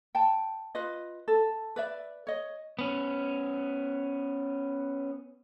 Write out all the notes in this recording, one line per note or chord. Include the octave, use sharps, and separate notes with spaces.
G5 A5
F4 B4 D#5
A4
B4 D5 E5
C#5 D#5
B3 C#4